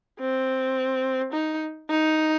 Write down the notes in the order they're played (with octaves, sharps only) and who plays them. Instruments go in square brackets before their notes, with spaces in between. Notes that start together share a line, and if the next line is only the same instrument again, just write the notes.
[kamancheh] C4
D#4
D#4